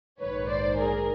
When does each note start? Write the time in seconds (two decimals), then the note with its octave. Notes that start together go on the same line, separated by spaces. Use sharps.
0.20 A#1 G#2 D#3 B4 C#5
0.49 C5 D5
0.77 G#4 A#4